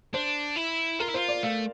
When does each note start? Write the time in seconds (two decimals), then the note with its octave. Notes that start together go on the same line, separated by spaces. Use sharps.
0.14 D4 C5
0.57 E4
1.00 F4 A#4
1.09 E4
1.14 F4 C5
1.28 D5
1.43 A3 F5